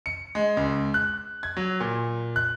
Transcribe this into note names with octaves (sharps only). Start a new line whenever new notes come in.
C#7
G#3
C#2
F#6
G#6
F#3
A#2
F#6